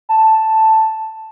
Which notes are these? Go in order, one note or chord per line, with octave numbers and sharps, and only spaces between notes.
A5